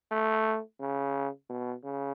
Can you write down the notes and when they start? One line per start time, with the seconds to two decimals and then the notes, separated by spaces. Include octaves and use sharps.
0.11 A3
0.80 C#3
1.49 B2
1.84 C#3